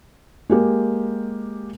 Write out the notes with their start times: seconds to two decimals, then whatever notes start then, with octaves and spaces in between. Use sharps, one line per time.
0.50 G#3 A#3 G4